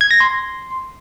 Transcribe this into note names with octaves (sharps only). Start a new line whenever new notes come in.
G#6
A#6
C6